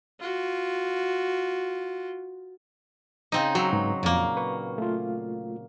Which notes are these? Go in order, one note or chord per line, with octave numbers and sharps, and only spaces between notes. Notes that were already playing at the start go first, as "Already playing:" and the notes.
F4 F#4
C#3 C4 D#4
F#3 F#4 E6
G#2 B4
F2 A#2 A#3
B4 C#6
A3 F4